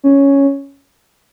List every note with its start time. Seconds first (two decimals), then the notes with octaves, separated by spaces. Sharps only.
0.04 C#4